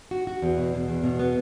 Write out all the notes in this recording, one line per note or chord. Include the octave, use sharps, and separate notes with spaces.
F#4
F#4
E2
B2
B2
E2
B2
B3